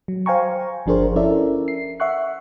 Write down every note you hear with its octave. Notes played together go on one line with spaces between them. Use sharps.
F#3
C5 F5 G5 G#5 A#5 C#6
G1 F3 D4 G#4 A#4 C5
C#4 E4 A4 A#4 D5 E5
C7
E5 F#5 C#6 F#6